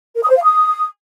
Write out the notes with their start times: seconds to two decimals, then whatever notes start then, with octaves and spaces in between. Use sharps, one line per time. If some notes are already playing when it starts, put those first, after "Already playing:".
0.15 A#4
0.22 D#6
0.29 C5
0.36 F5
0.43 D#6